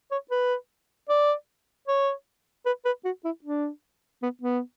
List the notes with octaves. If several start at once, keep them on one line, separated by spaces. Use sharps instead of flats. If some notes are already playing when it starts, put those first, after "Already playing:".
C#5
B4
D5
C#5
B4
B4
F#4
E4
D4
B3
B3